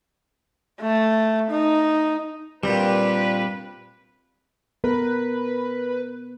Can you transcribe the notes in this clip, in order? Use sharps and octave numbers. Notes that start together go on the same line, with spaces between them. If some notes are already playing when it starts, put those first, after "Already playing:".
A3
D#4
G2 A#2 G3 C4 G4 B4 D5
B3 A#4 B4